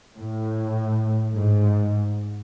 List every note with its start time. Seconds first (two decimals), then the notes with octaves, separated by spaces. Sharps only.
0.18 A2
1.34 G#2